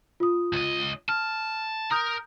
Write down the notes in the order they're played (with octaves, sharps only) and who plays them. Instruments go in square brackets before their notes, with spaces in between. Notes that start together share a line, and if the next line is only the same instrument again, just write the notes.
[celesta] F4 D#6
[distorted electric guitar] C#2 D#5
[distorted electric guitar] A5 [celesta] F6
[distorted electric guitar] A#4 [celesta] A#5 D#6 G6